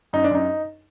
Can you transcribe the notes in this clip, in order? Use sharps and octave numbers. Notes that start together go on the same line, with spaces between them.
F#2 D#4
D4
F#2 D#4